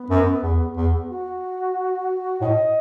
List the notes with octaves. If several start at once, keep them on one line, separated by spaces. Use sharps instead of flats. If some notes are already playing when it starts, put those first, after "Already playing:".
Already playing: B3
F#2
E2
E2
F#4
A2 D#5